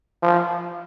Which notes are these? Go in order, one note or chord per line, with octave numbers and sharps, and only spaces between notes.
F3